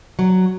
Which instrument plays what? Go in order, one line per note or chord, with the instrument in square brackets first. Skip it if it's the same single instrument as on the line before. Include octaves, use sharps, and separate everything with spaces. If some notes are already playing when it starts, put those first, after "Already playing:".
[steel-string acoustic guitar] F#3